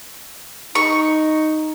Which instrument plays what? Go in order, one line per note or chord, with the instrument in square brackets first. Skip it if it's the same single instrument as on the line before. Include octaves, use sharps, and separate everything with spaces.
[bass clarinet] D#4 [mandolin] C#6